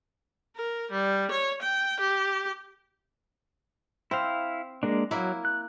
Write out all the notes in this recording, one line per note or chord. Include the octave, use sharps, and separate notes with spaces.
A#4
G3
C#5
G5
G4
C4 E4 F5
G#3 A#3 D4
F#3 A#3 E4
F#6